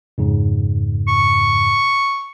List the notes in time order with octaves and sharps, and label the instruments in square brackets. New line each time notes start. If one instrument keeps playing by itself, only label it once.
[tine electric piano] F2 G#2 C#3
[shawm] C#6